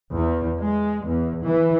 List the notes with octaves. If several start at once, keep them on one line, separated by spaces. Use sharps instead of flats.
E2
G#3
E2
E3